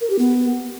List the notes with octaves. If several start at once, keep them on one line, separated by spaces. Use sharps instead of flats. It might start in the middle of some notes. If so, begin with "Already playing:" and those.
A#4
G4
B3